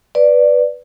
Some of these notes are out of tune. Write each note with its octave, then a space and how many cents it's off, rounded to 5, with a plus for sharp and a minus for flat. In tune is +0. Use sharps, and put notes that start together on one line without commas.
B4 +0 D5 +0